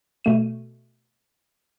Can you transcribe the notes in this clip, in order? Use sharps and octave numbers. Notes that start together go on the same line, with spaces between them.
B2 A3 D#7